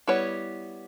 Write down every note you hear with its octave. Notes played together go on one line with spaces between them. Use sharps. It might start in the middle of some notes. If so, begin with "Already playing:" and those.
G3 B3 E4 C#5